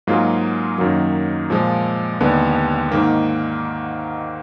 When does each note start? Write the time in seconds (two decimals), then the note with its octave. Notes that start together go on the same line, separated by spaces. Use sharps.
0.07 G#2 F#3 A#3 F4 G#4
0.78 F#2 D#3 F#3 A#3
1.50 A#2 F3 G#3
2.21 D#2 D3 G#3 B3
2.92 G#2 D#3 A#3